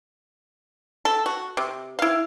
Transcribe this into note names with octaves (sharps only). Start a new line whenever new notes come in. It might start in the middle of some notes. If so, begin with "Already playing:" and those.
A4
F#4
C3
E4 F5